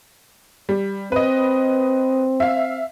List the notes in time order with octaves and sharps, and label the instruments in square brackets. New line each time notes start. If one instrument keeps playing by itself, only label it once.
[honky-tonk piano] G3
[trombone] C4 [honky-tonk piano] B4 D#5
[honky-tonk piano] E5 F5